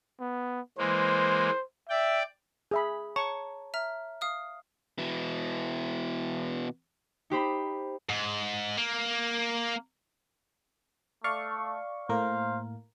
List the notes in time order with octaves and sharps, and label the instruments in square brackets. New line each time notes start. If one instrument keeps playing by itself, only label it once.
[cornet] B3
[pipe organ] E3 G#3 A#3 [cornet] C5
[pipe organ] D5 G5 [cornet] E5
[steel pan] G#4 E5 B5
[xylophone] C#5 A5 A#5 [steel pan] C#6
[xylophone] E5 A#5 F6
F5 D#6 F6
[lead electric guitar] B2 E3
[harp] D#4 G4 C5 B5
[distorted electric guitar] G#2
A#3
[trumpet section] A3 [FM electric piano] D5 F5 C#6
[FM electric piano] A2 A#3 A#4 [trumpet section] C5 F5